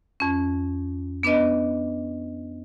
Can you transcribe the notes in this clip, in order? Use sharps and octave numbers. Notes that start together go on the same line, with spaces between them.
F2 C#4
B3 D4 B4 D#5